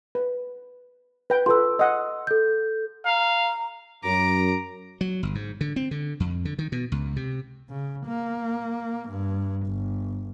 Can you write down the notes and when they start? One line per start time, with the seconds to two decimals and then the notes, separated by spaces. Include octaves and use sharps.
0.15 B4
1.30 B4 G5
1.46 F4 A4 B4 C6 E6
1.79 D#5 F#5
2.27 A4 G6
3.06 F5 A#5
4.03 F#2 A#5 D6
5.01 F#3
5.23 G1
5.35 G#2
5.61 D3
5.76 C4
5.91 D3
6.20 F2
6.45 D3
6.59 D#3
6.72 B2
6.92 C#2
7.16 C3
7.69 C#3
8.07 A#3
9.09 G2
9.67 G1